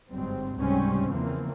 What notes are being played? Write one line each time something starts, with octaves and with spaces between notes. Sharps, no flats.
G1 G#2 F#3 G3 C4
C#2 G#2 C3 G3 C4 C#4
E2 C#3 E3 F3 A#3 C4